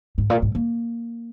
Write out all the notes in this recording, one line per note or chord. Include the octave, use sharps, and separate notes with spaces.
G#2
A#2
G#2
A#3